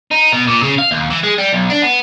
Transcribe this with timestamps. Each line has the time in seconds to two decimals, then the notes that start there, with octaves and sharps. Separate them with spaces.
0.11 D#4
0.32 B2
0.47 A#2
0.63 C#3
0.78 F5
0.91 D#2
1.10 E3
1.23 G#3
1.38 G3
1.53 B1
1.70 D4
1.82 B3